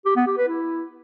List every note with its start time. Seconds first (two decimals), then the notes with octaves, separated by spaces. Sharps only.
0.05 G4
0.16 B3
0.27 G4
0.37 B4
0.48 E4